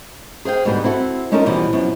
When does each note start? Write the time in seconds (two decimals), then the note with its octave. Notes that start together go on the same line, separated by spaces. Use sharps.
0.45 G#4 C5 F5 G5
0.65 G#2 B2 D3 G3 B3
0.84 C4 E4 F#4 A4
1.32 G#3 C#4 D#4 F4 A4 A#4
1.46 B2 E3 F3 G3
1.73 F#2 B2 F3